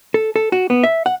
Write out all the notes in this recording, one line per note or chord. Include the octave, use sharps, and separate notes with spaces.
A4
A4
F#4
B3
E5
F#5